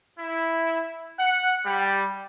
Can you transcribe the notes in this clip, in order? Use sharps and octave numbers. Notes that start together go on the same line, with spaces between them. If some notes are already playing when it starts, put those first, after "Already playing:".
E4
F#5
G3